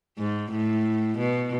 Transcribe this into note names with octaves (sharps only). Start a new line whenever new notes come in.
G#2
A2
B2